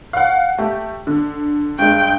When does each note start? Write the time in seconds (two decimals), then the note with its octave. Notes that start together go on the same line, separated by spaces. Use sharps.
0.13 F5 F#5
0.58 A3 G4
1.07 D3
1.79 G2 G#3 G5